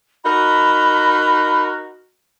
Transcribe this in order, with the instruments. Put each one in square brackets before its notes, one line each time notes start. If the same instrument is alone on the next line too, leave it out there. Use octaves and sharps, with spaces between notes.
[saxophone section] D#4 F#4 A#4 [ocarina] B5